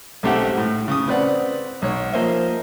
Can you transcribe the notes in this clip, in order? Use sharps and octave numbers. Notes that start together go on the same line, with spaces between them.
B1 A3 C4 G4 E5 F#5
A2
C#3 D#6
C4 B4 D5 F#5
B1 C#5
F3 A#3 C5 D#5 E5